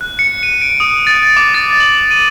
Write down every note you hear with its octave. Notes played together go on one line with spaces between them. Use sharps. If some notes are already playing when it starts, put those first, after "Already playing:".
F#6
C#7
D#7
D7
D#6
A6
D6
A6
F#7
D#7